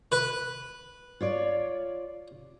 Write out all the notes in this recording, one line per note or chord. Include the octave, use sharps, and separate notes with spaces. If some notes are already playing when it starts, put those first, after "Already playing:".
B4
F4 C#5 D5